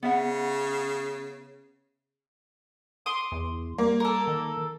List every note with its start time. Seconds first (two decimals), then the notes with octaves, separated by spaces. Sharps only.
0.03 C#3 B3 E5 F#5
3.06 C6 D6 D#6
3.32 E2
3.78 G3 A#3
4.00 A4 A#4
4.27 D#3